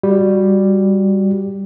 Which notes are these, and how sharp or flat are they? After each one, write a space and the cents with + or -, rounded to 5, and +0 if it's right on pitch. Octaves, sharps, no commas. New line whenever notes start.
G3 +5 F#4 +0